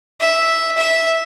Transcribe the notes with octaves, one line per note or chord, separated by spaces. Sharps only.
E5
E5